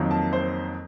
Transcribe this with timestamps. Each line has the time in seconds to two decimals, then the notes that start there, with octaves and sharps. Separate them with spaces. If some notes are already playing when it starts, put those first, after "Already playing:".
Already playing: F2 D#3 F#3 A#3
0.11 A5
0.33 C5